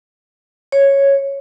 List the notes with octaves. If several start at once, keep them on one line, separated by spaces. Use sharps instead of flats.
C#5